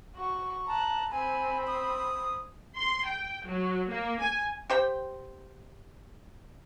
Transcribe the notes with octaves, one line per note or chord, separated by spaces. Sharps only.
F#4 C#6
A5 A#5 F#6
C4 G#5 B5
D#6
C6
G5
F#3
A#3
G#5
G4 C5 G5